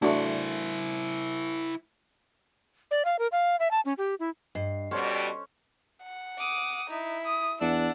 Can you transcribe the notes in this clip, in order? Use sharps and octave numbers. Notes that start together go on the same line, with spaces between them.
A3 D4 E4 F#4 C5
D5
F5
A#4
F5
E5
A5
C#4
G4
E4
G2 D#5 C7
B2 G3 C#4 A4 C5 C#5
F#5
D6 D#6
D#4 E4
D#6
E2 D4 F#5 E6